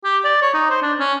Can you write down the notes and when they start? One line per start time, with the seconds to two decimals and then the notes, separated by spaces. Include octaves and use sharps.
0.04 G4
0.25 D5
0.42 C#5
0.54 D#4
0.70 C5
0.82 D4
0.99 C#4